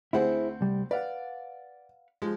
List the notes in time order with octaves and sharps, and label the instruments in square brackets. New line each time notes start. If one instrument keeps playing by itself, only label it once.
[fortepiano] D2 C4 F#5 [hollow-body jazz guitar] E4 G#4 C5
[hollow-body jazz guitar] C2 G3
[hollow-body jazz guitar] B4 F5 F#5 [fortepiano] D5
[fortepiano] F3 G#3